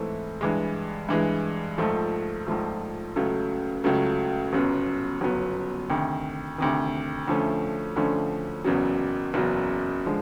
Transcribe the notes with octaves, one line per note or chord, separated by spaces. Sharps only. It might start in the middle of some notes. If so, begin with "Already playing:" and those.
Already playing: G#2 E3 A3 C4 E4
G2 E3 G#3
G2 E3 G#3
A#1 G#2 F3 A3
A#1 G#2 F3 A3
C#2 C#3 F#3 A3
C#2 C#3 F#3 A3
G1 F#2 C#3 F#3 B3
G1 F#2 C#3 F#3 B3
D2 C3 D#3
D2 C3 D#3
D2 D3 F3 A3 C#4
D2 D3 F3 A3 C#4
F#1 E2 C#3 F#3
F#1 E2 C#3 F#3
D3 F3 G#3